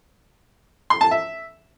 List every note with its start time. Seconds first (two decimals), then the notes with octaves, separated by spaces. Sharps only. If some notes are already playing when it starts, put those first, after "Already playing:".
0.90 C6
1.01 A5
1.11 E5